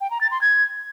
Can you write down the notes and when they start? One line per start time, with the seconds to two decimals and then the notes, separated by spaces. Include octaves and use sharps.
0.01 G5
0.11 A#5
0.21 A6
0.31 C6
0.41 G#6